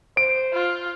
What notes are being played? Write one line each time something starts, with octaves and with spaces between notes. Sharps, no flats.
C5 D7
F4